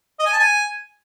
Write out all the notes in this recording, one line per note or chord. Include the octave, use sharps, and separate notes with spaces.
D#5
G#5
A5
G#5